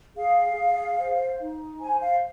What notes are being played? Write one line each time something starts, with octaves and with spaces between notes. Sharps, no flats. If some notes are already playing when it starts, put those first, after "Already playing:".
G#4 F5
G#4
C5
D#4
C5 G#5
F5